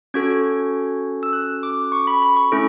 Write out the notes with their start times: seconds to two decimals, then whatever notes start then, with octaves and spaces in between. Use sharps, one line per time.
0.14 C#4 F#4 A4 G#6
1.23 E6
1.33 F#6
1.63 D6
1.92 C#6
2.07 B5
2.22 B5
2.37 C#6
2.52 A3 C#4 E4 A4